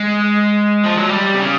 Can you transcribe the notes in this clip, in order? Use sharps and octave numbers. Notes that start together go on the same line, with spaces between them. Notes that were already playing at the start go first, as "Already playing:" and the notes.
Already playing: G#3
F3
F#3
G3
C3
C#3